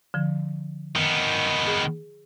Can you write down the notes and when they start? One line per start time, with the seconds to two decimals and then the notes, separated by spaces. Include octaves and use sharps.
0.14 D3 F3
0.96 D#3 B3
1.67 G#4